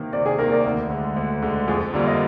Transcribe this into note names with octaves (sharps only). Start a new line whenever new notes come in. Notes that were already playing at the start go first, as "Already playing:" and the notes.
Already playing: C3 D#3 A#3
C3 D5
G#4
D#3 A#3 A#4
D5
D2
D3 G#3
D2
D3 G#3
F2 G#4
D3 G3 A#3 F4 D5
D#5